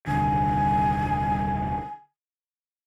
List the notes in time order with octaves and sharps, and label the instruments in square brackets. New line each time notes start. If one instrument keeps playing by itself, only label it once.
[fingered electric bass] D#1 C2 D3 [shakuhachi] G#5